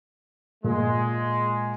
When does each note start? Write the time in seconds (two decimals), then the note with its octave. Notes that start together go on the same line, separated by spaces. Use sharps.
0.64 A#2 G#3